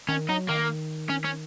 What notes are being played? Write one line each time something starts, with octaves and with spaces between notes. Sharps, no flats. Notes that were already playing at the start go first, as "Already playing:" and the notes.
D#3 C#4
F#3 D#4
D#3 A#3
C#4
C#4